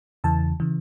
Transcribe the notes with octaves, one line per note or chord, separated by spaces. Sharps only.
E2 C#3 E3 A5
C#3 E3